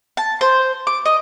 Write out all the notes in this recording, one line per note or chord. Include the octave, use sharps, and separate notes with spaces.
A5
C5
D6
D#5